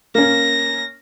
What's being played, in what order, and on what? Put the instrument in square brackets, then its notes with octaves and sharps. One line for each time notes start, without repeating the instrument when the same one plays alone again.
[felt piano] A#3 C#4 [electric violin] A#6